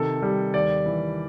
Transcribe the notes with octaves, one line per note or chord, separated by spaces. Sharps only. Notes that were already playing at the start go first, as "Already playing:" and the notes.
Already playing: C3 D#3 A4
G3
D#2 D5
E3